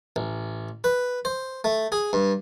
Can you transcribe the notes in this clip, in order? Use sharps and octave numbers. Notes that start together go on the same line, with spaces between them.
A1
B4
C5
A3
G#4
G2